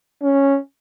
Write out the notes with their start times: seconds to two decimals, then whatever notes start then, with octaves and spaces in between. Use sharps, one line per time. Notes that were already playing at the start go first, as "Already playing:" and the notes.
0.22 C#4